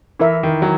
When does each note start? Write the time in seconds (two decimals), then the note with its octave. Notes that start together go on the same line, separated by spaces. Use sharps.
0.19 E3 E4 A#4 E5
0.43 D#3
0.62 F#3